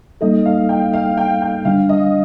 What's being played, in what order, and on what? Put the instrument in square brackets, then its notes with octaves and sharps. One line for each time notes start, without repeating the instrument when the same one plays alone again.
[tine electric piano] G3 A#3 D#4 A4 [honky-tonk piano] D#5
[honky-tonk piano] F5
G5
F5
G5
G5
[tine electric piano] D3 G3 D4 [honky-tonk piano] F5
[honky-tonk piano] D#5